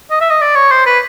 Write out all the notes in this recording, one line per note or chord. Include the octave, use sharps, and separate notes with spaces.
D#5
E5
D#5
D5
C#5
C5
B4